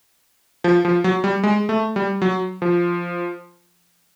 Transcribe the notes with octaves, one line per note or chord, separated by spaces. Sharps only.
F3
F3
F#3
G3
G#3
A3
G3
F#3
F3